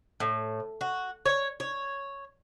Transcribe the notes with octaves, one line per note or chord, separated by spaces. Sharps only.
A2
F#4
C#5
C#5